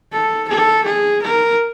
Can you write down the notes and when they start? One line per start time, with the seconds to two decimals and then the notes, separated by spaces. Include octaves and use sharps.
0.13 A4
0.49 A4
0.85 G#4
1.22 A#4